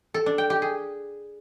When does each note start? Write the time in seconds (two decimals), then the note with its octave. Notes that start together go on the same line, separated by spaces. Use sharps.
0.14 A4
0.26 D4
0.38 G5
0.50 G4
0.62 G#4